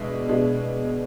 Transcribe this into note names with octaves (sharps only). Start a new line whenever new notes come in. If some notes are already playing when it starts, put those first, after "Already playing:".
Already playing: B2 G#3 D4 E5
B2 G#3 D4